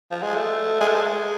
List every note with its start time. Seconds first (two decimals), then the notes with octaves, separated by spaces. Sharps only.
0.11 F3
0.23 G#3
0.35 A3
0.81 G#3
0.87 A3
0.95 G#3